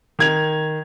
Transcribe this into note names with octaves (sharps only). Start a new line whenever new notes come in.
D#3 G#6 F7